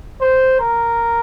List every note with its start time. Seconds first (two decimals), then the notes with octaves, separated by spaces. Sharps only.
0.21 C5
0.61 A#4